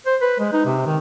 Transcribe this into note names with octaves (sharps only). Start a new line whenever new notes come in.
C5
B4
G#3
D#4
C3
D#3